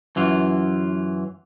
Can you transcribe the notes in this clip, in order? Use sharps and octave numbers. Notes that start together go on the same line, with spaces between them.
F#2 E3 F4